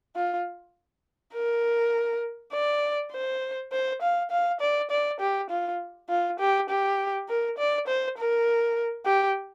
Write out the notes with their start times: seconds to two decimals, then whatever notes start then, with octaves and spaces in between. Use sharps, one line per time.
0.16 F4
1.34 A#4
2.53 D5
3.12 C5
3.72 C5
4.02 F5
4.31 F5
4.60 D5
4.90 D5
5.20 G4
5.50 F4
6.09 F4
6.39 G4
6.69 G4
7.28 A#4
7.58 D5
7.87 C5
8.18 A#4
9.06 G4